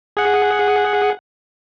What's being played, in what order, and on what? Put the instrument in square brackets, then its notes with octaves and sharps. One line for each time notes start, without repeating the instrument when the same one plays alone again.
[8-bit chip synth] G#4 F#5